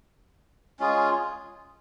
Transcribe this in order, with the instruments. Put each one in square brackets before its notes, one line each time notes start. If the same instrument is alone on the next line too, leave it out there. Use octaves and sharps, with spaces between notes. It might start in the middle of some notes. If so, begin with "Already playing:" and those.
[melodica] G#3 C#4 F4 G#4